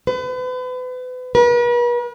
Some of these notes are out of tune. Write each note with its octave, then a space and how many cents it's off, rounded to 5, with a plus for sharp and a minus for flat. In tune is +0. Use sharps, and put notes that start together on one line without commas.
B4 +35
B4 -45